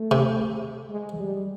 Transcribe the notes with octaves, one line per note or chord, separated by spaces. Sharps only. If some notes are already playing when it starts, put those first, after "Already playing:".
Already playing: A3
C3
G#3
G3